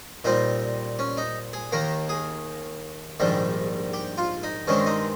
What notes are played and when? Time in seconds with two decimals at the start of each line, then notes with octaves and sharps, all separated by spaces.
0.24 A#2 G3 C4 D#4
0.99 C#4
1.17 D#4
1.53 G#4
1.72 D#2 D#3 A#3 A#4
2.09 G#4
3.20 A#1 G#2 D#3 G3
3.93 G4
4.18 F4
4.43 D#4
4.67 G2 D#3 G#3 C4 C#4
4.86 D#4